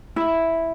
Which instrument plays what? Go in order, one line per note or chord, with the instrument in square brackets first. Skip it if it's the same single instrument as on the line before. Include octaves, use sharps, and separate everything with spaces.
[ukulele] E4